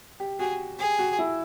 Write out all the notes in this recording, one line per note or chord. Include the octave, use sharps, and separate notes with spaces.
G4
F#4 G#4
G4 G#4
F#4
E4